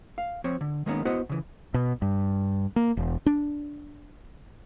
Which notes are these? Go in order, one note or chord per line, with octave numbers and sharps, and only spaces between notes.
F5
F3 C4 C#5
D3
D#3 G#3 A#3 B3 C#4 D#4
B3 E4 F#4 C5 D#5 F#5
C#3 E3
B2
G2
A#3
E1
D4